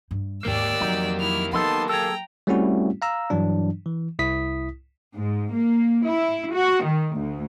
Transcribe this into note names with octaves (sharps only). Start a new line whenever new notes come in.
G2
D#2 G#2 A#3 G4 D5 E6
F2 F#3 D#4
E4 F6
F#3 B3 D#4 A4 A5 C6
G#4 A4 G5 A#5
G3 A3 C4 C#4 E4 F#4
F5 A#5 E6
G2 E3 F#3 D4
E3
C2 E4 D#6 B6
G#2
A#3
E4
F#4
D#3
D2